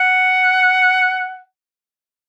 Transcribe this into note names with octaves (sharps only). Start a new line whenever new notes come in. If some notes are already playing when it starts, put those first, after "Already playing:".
Already playing: F#5